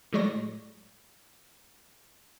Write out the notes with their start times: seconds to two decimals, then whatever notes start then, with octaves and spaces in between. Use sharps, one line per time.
0.13 A2 F#3 G#3 C#5 D5 A#6